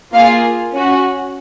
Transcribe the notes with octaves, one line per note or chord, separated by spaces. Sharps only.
A#3 F4 G#4 F5
C#4 F#4